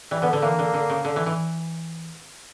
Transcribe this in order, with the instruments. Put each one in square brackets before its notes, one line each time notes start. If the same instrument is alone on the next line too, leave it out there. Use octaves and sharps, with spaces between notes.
[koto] E3 [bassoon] G3
[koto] D3 [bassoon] B3
[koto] D3
[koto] E3 [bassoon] A#3
[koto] D3
D3
C#3
D3
E3
E3